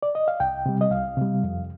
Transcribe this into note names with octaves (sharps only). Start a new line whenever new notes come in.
D5
D#5
F5
C2 G5
C3 G3
D#5
C2 F5
C3 G3
F2